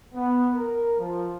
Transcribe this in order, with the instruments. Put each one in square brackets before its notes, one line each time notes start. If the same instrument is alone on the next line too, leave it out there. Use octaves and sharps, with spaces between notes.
[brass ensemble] B3
A#4
F3